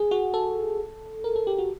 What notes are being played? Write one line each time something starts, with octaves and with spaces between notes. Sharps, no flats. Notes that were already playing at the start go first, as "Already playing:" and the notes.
Already playing: G#4
F#4
A4
A#4
A4
G4
F#4